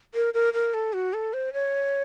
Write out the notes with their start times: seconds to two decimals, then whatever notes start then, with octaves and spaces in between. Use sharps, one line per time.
0.15 A#4
0.34 A#4
0.54 A#4
0.74 A4
0.93 F#4
1.14 A4
1.33 C5
1.53 C#5